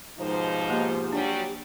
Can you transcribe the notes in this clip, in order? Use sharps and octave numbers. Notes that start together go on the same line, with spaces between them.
D#2 G#2 B2 F3 D#4 C5
A#3 G4
F#3 G3 D4 G#5